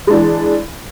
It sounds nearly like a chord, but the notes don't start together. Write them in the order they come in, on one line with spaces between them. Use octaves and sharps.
G#3 D4 E3